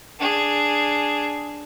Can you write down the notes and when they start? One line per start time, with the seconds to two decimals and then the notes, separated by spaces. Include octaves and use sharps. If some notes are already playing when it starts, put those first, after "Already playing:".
0.19 D4 G#4